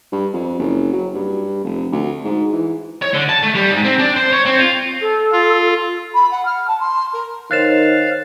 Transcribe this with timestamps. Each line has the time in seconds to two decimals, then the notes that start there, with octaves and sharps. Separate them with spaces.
0.12 G2
0.33 F2
0.59 F#1
0.93 F#3
1.14 G2
1.64 F1
1.92 D2
2.24 G#2
2.53 E3
3.02 C#5
3.14 D3
3.29 A5
3.43 A3
3.55 G3
3.71 G#2
3.84 C4
3.99 D4
4.16 C5
4.32 C#5
4.45 C4
4.58 F4
5.01 A4
5.32 F4
6.15 B5
6.31 F#5
6.46 F6
6.68 A5
6.80 C6
7.14 A#4
7.51 D#3 A#4 C5 C#5 F5 F#6 A6 E7